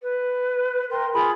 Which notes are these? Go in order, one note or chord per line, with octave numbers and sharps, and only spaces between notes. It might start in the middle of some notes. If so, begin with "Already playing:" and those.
B4
A#4 G5 C6
F4 G#4 B5